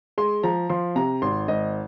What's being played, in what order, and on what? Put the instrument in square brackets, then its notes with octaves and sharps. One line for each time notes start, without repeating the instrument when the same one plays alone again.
[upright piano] G#3 C6
F3 A#5
F3 C6
C3 A#5
G#1 C6
G#1 D#5